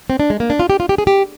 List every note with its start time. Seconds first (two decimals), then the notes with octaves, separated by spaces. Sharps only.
0.10 C4
0.20 D4
0.30 G#3
0.40 A#3
0.50 D4
0.60 F4
0.70 G4
0.80 F4
0.89 G4
0.98 G#4
1.07 G4